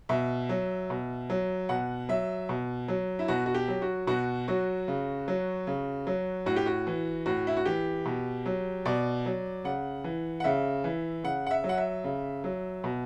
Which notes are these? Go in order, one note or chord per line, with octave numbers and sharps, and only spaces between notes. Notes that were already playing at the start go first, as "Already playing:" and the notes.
B2 E5
F#3
B2
F#3
B2 F#5
F#3 E5
B2
F#3
E4
B2 F#4
F#4
G4
F#3
F#4
B2 F#4
F#3 F#4
C#3
F#3
C#3
F#3
A2 F#4
G4
F#4
E3
A2 F#4
E4
F#4
E3 G4
B2
F#3
B2 D5
F#3
C#3 F#5
E3
F#5
C#3 E5
E3
C#3 F#5
F#5
E5
F#3
F#5
E5
C#3
F#3
B2